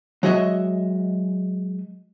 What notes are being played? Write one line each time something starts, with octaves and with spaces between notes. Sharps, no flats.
F#3 G#3 F#4 D#5 E5